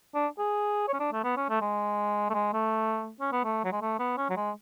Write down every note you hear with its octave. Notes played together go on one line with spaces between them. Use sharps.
D4
G#4
C#5
C#4
D4
A3
B3
C#4
A3
G#3
A3
G#3
A3
C#4
B3
A3
F#3
G#3
A3
B3
C#4
F#3
G#3